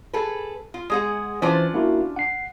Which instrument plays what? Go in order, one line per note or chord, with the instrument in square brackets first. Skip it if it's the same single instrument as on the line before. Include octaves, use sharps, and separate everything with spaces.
[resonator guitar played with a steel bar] G#4 A4 B4
F4
G#3 G#4 F#5
[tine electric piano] E3 C5 [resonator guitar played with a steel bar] C#4 D4 F4
[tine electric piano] A#3 E4 F#4
F#5 C7